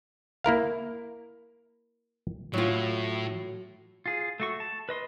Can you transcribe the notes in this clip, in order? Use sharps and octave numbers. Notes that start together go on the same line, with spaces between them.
A#3 E4 A#4 F5
A2 F#3 F4
F4 G#4
A3 F#4 C#6
A5
B4 D#5 C6